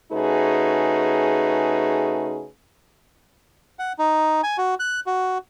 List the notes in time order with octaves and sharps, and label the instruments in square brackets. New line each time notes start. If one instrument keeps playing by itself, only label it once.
[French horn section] C#3 A3 D#4 F#4 G#4 B4
[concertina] F#5
D#4
G#5
F#4
F#6
F#4